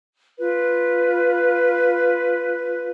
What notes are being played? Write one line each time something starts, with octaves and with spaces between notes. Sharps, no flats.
F4 B4